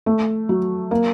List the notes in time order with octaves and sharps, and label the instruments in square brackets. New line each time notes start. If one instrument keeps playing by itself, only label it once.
[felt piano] A3
F#3
A#3